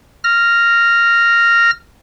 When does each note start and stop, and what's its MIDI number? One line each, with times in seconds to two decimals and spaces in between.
0.24 1.71 89
0.24 1.71 94